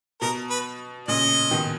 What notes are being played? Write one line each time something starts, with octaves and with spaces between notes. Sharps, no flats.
B2 A#4
B4
A#2 C#3 D#5
B2 D#3